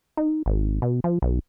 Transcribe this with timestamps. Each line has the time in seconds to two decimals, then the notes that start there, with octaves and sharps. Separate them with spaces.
0.17 D#4
0.46 G#1
0.82 B2
1.04 F3
1.22 B1